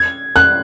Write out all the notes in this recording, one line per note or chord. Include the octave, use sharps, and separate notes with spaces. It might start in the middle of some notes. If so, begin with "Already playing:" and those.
Already playing: G#6
F#6